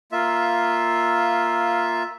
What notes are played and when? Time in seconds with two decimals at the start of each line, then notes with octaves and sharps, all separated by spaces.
0.12 A#3 F4 E5